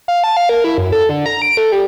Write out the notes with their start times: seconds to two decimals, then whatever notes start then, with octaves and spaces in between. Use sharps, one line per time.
0.08 F5
0.24 A5
0.37 F5
0.49 A#4
0.64 E4
0.78 F#2
0.92 A4
1.09 D3
1.26 A#5
1.42 D7
1.57 A3
1.72 G3